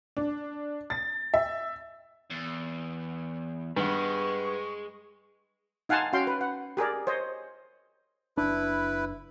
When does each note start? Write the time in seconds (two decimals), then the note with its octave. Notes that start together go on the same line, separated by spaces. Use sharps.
0.17 D4
0.90 A6
1.34 E5
2.30 E2
3.77 G2 G#3 B4 F#5 C#6
5.89 D#4 F5 F#5 G#5 A5 C6
6.13 C#4 F#4 F5 G5 C6
6.27 B4
6.41 F#5
6.77 G4 G#4 A#4 D5
7.07 C5 C#5 D#5
8.37 F#1 D4 E4 B4